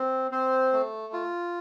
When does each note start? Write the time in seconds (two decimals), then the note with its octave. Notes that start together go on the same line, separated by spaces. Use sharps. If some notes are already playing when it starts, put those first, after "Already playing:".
Already playing: C4
0.31 C4 C5
0.73 A3
1.13 F4